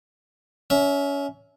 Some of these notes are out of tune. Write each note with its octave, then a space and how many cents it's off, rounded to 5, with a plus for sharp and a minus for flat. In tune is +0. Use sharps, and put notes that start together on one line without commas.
C#4 +25 E5 -10